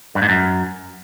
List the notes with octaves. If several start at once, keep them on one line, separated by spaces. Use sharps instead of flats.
G2
G#2
F#2